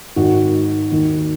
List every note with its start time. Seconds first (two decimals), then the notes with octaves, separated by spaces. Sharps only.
0.16 G#1 G#2 D#3 F#4
0.91 D#2 D#3